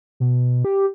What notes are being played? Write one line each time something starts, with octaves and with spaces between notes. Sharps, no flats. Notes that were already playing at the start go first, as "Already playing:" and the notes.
B2
G4